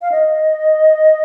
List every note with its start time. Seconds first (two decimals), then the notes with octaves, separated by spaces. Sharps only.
0.02 F5
0.12 D#5